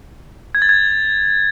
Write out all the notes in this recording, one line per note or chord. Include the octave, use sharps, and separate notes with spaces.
G#6
A6
G#6